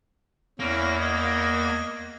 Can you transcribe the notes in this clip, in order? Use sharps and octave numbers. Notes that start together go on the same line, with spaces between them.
E2 A#3 C#4 E4 A#6
D#5 G#6